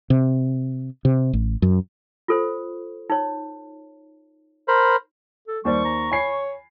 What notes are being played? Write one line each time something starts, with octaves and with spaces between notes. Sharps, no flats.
C3
C3
A1
F#2
F4 A4 C5
D#4 C#5
A#4 C5 B5
A4
D#2 G3 C5 D5 C#6
A#5
C#5 G#5 B5 C7